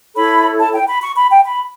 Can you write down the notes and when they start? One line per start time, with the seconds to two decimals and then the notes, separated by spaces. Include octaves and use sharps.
0.15 E4 A4 C#5 B5
0.59 A5
0.74 G5
0.88 B5
1.02 C#6
1.16 B5
1.31 G5
1.44 B5